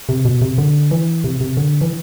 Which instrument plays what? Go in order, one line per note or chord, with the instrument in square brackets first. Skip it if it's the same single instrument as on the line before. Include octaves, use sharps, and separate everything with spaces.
[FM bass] C3
B2
C3
D3
E3
C3
C3
D3
E3